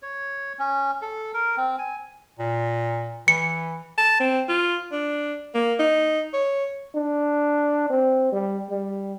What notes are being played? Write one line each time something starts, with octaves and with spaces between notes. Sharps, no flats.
C#5
C#4
A4
A#4
C4
G#5
A#2
E3 C#7
A5
C4
F4
D4
A#3
D#4
C#5
D4
C4
G3
G3